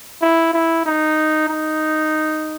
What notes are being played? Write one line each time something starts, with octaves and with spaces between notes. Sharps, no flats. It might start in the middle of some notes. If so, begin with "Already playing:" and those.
E4
E4
D#4
D#4